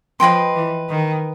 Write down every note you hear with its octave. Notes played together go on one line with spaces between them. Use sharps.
F3 B4 D#5 G5 C6
E3
D#3